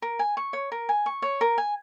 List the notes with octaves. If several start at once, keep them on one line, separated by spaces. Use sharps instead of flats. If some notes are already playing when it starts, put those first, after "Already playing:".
A#4
G#5
C#6
C#5
A#4
G#5
C#6
C#5
A#4
G#5